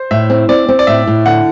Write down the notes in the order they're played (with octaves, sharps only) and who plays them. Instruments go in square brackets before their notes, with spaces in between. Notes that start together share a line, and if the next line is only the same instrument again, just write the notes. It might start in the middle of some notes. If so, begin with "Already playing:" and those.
Already playing: [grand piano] C5
[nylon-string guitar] A2 [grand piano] E5
[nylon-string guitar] C4
[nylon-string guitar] C4 [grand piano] D5
[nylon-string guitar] C4
[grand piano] D5
[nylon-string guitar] A2 [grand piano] E5
[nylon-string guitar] A2
[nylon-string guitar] D3 [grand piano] F#5